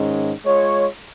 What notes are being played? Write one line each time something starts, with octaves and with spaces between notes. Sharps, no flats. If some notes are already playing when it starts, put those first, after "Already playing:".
Already playing: G#2 D#3 G#3 C#4
G#3 F4 C#5